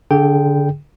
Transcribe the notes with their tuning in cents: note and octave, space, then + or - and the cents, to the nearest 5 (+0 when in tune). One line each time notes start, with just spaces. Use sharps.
D3 -20 G#4 +0 G5 +0